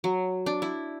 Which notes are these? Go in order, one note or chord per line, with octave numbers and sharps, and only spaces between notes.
F#3
D4
E4